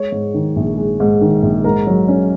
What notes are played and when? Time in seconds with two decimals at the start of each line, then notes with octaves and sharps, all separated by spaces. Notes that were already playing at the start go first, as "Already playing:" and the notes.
Already playing: G#3 C#5
0.12 G#2
0.34 D#3
0.56 A#1
0.77 G#3
1.00 G#2
1.21 D#3
1.43 A#1
1.64 G#2 A#4
1.87 F#3
2.08 C#4